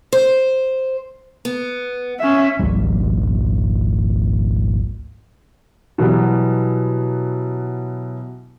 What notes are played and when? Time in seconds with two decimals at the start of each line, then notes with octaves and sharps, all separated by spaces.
0.13 C5
1.45 B3
2.19 C#4 E5
2.59 G#1 C#2 G3
5.98 B2 E3 F#3 G3 B3